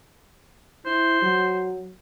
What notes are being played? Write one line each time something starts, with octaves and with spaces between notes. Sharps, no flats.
E4 C5
F#3